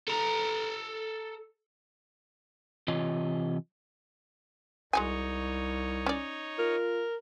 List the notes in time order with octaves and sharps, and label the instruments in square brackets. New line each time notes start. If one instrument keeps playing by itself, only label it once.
[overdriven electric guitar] A4 A#5
[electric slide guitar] C3 E3 F4 C#5 D#5
[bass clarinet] C2 [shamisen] G#3 F#4 G#5 [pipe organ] D#4 C#5
[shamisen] C#4 D5
[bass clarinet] F4 [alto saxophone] A#4